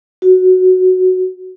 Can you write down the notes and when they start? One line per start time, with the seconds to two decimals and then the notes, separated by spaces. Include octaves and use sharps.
0.22 F#4